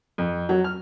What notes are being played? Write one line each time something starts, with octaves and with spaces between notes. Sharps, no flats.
F2
F#3
F6